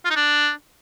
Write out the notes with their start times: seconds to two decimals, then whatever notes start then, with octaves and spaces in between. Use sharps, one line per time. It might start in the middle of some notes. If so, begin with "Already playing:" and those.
0.05 F4
0.11 D#4
0.16 D4